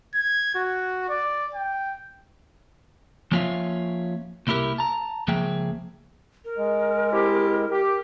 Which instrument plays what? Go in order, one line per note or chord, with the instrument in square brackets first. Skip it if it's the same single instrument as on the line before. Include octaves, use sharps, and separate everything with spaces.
[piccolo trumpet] G#6
F#4
D5
G5
[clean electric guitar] F3 A#3 C#4 F4 E5 F5
C2 A#3 E4 G4 A#4
A5 A#5
C#2 F3 A#3 G#4 E5 G5
[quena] A#4
[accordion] G#3
[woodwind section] C4 E4 G4
G4